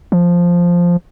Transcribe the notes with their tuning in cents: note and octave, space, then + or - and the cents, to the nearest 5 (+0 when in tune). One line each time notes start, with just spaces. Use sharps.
F3 +0